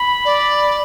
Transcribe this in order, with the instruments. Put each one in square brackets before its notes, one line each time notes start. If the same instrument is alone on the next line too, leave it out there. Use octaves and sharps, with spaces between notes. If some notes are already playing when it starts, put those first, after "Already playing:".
Already playing: [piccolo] B5
[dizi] D5